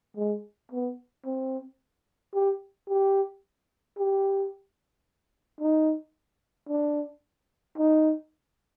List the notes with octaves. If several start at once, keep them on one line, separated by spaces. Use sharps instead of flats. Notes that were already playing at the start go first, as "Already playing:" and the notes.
G#3
B3
C4
G4
G4
G4
D#4
D4
D#4